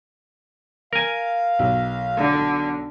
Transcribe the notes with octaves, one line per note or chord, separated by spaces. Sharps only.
A#4 F5 G#5
B1
D3